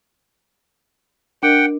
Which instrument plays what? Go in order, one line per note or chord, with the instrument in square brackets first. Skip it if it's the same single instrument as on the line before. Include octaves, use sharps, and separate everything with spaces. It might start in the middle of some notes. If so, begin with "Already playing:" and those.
[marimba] D4 A#4 D#5 [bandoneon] F#5 G5